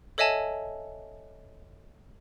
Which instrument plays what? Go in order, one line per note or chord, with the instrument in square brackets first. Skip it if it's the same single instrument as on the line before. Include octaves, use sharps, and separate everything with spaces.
[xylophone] A4 C#5 D#5 E5 G#5 A5